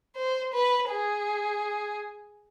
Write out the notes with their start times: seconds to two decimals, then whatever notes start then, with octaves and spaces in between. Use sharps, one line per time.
0.16 C5
0.54 B4
0.90 G#4